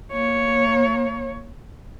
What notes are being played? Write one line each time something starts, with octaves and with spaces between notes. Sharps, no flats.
A#3 C#5